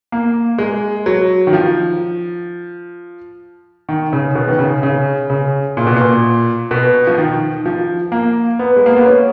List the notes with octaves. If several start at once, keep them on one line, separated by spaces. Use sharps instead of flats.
A#3
G#3
F#3
D#3
F3
D#3
C#3
B2
D#3
C#3
C#3
C#3
A#2
B2
A#2
B2
F3
D#3
F3
A#3
B3
G#3
A#3
B3
C#4